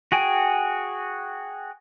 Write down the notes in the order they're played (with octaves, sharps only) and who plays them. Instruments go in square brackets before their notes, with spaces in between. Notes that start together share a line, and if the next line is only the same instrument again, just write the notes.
[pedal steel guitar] F#4 G#4 G5 G#5